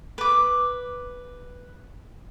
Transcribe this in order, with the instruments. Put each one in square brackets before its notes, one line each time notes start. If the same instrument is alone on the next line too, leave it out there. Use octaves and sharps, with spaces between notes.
[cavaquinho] B4 D6